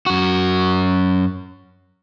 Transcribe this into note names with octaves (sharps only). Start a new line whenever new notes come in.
F#2 F#4